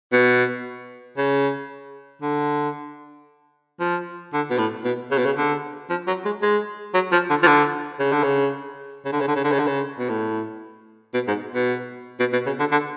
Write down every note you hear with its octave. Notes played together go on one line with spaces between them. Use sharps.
B2
C#3
D3
F3
D3
B2
A2
B2
C#3
B2
C#3
D3
F3
F#3
G#3
G#3
F#3
F3
D3
F3
D3
C#3
D3
C#3
C#3
D3
C#3
D3
C#3
D3
C#3
D3
C#3
B2
A2
B2
G#2
B2
B2
B2
C#3
D3
D3